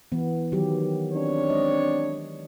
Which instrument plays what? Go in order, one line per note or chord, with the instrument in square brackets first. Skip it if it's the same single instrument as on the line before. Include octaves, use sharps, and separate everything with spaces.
[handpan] E3 B3
D#3 F#3 G4
[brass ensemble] C4 D4 C#5
[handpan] G#3 D#5